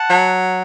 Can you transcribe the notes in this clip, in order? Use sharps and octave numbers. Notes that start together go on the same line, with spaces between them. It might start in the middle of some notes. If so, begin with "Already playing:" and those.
Already playing: F#5 A5
F#3